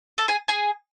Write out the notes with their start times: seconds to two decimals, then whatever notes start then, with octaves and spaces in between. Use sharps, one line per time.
0.18 A4 A5
0.28 G#4 G#5
0.48 G#4 G#5